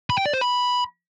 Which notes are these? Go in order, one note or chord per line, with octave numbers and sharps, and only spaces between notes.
B5
G5
D5
C5
B5